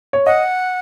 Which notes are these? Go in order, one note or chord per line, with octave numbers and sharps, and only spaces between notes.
C#5
D#5 F#5